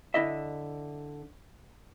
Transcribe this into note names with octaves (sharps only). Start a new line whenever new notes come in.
D3 E4 D#5 E5